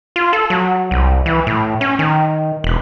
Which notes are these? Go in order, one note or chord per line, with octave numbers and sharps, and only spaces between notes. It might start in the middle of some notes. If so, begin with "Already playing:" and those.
F4
A4
F#3
C2
E3
A2
C#4
D#3
E1